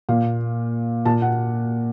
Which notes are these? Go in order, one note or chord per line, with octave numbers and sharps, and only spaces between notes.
A#2 F5
A#2 A5
F#5